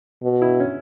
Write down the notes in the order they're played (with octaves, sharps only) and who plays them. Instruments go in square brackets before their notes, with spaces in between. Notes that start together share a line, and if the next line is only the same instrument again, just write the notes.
[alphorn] B2
[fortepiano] E4
C#4